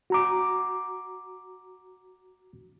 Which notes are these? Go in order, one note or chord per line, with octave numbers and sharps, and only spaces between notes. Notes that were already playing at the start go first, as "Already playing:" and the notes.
F#4 A#5 D6